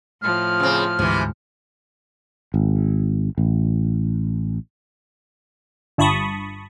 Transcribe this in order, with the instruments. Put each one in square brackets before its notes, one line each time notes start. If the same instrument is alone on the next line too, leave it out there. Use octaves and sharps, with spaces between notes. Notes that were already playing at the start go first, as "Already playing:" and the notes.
[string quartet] A2 F3 [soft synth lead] F6
[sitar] C#3 C4
[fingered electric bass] D2 G#2 [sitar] C3 E3
[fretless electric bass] G#1
A1
[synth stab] G1 G2 A5 B5 C#6 D#6